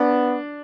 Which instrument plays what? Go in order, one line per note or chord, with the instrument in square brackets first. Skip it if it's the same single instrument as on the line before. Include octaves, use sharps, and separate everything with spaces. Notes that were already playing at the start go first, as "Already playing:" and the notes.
Already playing: [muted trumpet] B3 [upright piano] D4